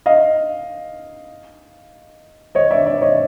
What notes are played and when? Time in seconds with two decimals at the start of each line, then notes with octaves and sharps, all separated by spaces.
0.06 D#5 F5
2.55 C#5 D#5
2.71 D5 E5
2.86 D5 E5
3.02 C#5 D#5